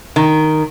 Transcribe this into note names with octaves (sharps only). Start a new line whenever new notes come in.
D#3